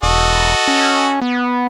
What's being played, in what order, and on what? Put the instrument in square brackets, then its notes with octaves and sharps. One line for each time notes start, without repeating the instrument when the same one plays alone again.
[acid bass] E1 [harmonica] F#4 A4 D#5
[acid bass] C#4
B3